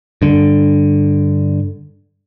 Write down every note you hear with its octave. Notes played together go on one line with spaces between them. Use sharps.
G2 D3